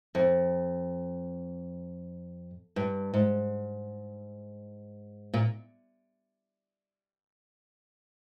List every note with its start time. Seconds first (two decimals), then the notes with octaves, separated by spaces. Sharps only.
0.15 F2
2.76 G2
3.14 G#2
5.34 A#2